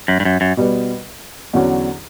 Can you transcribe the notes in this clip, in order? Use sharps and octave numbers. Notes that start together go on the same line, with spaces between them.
F#2
G2
F#2
F#2
B2 G3 B3
E2 D3 F#3 C#4 F#4